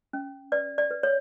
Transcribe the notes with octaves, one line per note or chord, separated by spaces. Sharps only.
C#4
B4 D5
D5
B4
C#5